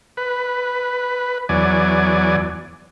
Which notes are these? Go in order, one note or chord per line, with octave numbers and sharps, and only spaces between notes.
B4
E2 F#3 D5 G#5